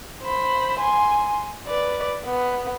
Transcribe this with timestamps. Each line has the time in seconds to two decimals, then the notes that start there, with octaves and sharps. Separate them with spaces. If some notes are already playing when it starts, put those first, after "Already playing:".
0.22 C5 B5
0.80 G#5 C6
1.67 B4 D5
2.25 B3